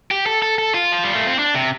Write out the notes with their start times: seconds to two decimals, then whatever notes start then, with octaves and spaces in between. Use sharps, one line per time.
0.11 G4
0.26 A4
0.42 A4
0.58 A4
0.74 F4
0.92 F3
1.04 G3
1.15 A3
1.27 C4
1.39 D4
1.54 C3